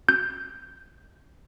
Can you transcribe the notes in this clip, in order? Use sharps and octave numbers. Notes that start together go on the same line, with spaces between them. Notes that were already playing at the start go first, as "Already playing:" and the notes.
G6